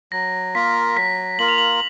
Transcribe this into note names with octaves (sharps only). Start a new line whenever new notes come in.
F#3 A#6
A#3 F4 A#4 B6
F#3 B6
A#3 F4 A#4 F#7
F7
F#7